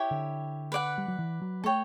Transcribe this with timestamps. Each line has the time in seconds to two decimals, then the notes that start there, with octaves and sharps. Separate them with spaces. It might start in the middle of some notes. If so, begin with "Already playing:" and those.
Already playing: E4 G4 C#5 G5
0.11 D3
0.72 B4 D5 F#5
0.98 G3
1.08 F#3
1.19 E3
1.42 F#3
1.64 A3 A4 C#5 G5